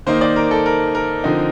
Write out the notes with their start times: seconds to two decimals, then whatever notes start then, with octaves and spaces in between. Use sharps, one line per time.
0.07 D#3 A#3 D#4 C5
0.21 D5
0.36 A#4
0.51 A4
0.66 A#4
0.95 A#4
1.24 D3 F3 C4 D#4